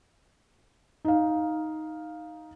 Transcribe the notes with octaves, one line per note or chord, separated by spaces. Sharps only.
D#4 F5